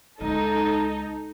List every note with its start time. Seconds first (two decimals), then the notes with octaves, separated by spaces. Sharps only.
0.21 C#2 C#3 D#4 A4